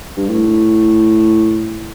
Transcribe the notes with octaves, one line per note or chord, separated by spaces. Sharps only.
G2
A2